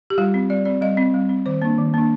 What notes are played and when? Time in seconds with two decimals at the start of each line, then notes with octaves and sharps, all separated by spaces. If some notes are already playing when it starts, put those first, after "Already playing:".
0.10 G4
0.18 G3 F4
0.34 C4
0.50 G3 D5
0.65 C4 D5
0.81 G3 D#5
0.97 C4
1.14 G3
1.29 C4
1.46 D#3 C5
1.62 A#3 D4
1.78 D#3
1.94 A#3 D4